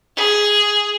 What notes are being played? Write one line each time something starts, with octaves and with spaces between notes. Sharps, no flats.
G#4